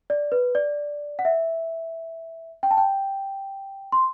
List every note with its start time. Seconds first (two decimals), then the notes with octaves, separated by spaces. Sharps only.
0.10 D5
0.32 B4
0.55 D5
1.19 F#5
1.25 E5
2.63 G5
2.71 A5
2.77 G5
3.92 C6